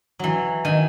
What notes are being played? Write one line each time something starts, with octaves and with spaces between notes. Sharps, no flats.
E3 F#3
D#3 G#5